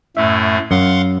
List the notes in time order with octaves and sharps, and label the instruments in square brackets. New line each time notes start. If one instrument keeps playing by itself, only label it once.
[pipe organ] F#2 A2 A3 [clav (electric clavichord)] E5
[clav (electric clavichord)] F#2 F#3 [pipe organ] F5 F#5 C6